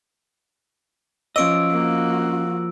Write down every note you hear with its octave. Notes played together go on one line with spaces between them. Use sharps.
F3 C#4 C#5 D#5 D6 E6 D7
A#3 F#4